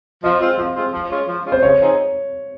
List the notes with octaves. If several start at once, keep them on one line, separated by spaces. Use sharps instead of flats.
F3 D#5
G#3 C4 F4
F3 F5
G#3 C4 F4
F3
G#3 C#4 F4
F3
G#3 C#4 F4
C5
C#3 C#5
F3 C4 D#4 G#4